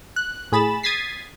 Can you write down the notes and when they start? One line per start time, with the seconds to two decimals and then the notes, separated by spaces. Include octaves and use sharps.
0.16 F#6
0.52 A2 G#4 B5 A6 E7
0.83 D#6 G#6 A6 B6 C7